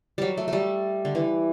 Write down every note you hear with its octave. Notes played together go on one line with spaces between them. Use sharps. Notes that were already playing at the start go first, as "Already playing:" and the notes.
F#3 G3
A3
G3 A3
D3
E3